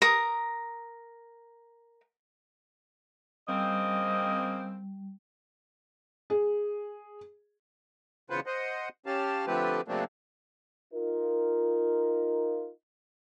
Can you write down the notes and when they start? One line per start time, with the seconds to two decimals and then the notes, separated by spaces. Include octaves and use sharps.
0.02 A#4 D#6
3.48 C#3 G3 A#3 C4 D#5
6.30 G#4
8.30 E2 C#3 F4 B4 C5 F#5
8.46 C5 D#5 F#5
9.06 C#4 G4 F5 A5
9.47 D3 F3 A3 C4 G4 B4
9.88 C#3 F#3 A3 A#3 C4 D4
10.94 D#4 F4 A#4